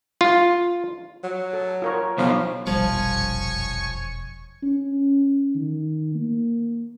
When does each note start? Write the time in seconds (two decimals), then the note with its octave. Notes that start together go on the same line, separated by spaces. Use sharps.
0.21 F4
1.23 F#3
1.53 A4
1.82 F4 A#4 C#5
2.18 B1 B2 F3
2.67 E1 A#1 F2 F3 G3 C#5 G#5 C#6
4.63 C#4
5.55 D#3
6.15 A#3